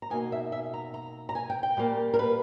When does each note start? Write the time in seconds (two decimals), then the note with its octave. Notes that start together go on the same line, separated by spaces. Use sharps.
0.02 A#5
0.10 B2 A#3 D#4 G#5
0.32 E5
0.52 E5
0.74 A#5
0.94 A#5
1.29 A#5
1.35 G#5
1.50 G5
1.63 G5
1.77 A#2 G3 A#3
2.14 A#4
2.19 B4